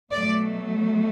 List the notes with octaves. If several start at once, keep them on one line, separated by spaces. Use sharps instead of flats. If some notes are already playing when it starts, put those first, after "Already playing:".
B2 F#3 A3 D5